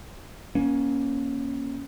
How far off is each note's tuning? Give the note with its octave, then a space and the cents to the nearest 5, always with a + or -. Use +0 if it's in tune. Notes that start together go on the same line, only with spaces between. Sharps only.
A#3 +25 C#4 +0